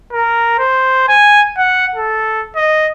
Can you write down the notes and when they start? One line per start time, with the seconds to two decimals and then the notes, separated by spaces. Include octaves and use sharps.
0.12 A#4
0.59 C5
1.08 G#5
1.57 F#5
1.95 A4
2.56 D#5